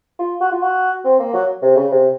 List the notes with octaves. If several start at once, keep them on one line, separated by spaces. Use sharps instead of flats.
F4
F#4
F4
F#4
C4
A#3
F#3
C3
C#3
C3